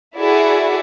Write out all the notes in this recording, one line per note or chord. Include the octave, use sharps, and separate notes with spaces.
E4 F#4 G#4 A4 D5 E5